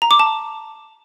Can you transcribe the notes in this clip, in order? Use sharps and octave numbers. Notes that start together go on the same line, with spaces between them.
A#5
D6
A5